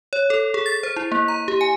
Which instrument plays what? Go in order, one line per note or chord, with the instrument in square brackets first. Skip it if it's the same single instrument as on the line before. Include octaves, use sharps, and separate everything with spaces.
[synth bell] C#5
A4
G#4
A6
C5
E4
A#3
A#5
G4
G#5